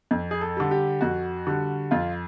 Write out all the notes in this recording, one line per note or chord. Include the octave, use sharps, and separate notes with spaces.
F2
G#4
A4
D3 G3
G4
F2 F#4
D3 G3
F2 F4